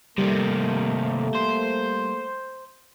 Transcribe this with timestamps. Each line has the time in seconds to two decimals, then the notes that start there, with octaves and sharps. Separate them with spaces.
0.18 C3 D#3 G3 A3 A#3
1.35 C5